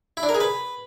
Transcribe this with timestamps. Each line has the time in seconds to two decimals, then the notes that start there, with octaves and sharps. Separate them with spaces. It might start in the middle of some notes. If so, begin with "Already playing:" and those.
0.17 E4
0.23 D4
0.29 A#4
0.35 G#4
0.40 B4